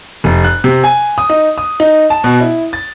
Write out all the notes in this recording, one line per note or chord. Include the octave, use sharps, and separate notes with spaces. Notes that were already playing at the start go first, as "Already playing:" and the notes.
F1
F#6
C3
G#5
D#6
D#4
D#6
D#4
A5
B2
E4
A6